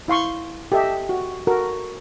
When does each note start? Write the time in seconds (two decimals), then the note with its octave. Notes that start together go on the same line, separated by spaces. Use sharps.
0.08 E4 F5 C6 C#6
0.72 G4 A4 D#5 E5
1.09 F#4
1.47 F#4 A4 A#4